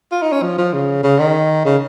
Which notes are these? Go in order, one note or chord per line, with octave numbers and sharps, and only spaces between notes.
F4
D#4
C#4
F3
F3
C#3
C#3
D#3
C#3